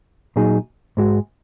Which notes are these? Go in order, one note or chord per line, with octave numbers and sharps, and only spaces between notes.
A#2 F#3 D#4 G#4
G#2 G#3 F#4